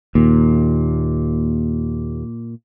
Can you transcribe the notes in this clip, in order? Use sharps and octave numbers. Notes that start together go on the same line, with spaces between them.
D#2 A#2